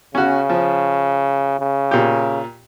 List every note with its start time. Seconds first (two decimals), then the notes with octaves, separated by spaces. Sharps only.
0.15 C#3 C#4 F#4
0.49 F3
1.60 C#3
1.91 A#2 G4